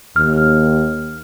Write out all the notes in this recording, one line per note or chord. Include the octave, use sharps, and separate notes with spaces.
D#2 F6